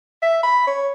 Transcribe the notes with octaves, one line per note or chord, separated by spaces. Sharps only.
E5
B5
C#5